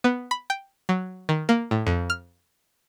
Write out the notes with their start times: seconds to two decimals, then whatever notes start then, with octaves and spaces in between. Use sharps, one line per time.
0.04 B3
0.31 B5
0.50 G5
0.89 F#3
1.29 D#3
1.49 A#3
1.71 A2
1.87 F2
2.10 F6